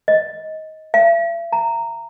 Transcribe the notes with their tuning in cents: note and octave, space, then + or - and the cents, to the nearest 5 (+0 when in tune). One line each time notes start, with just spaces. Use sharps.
D#5 +15
E5 +45
A#5 -15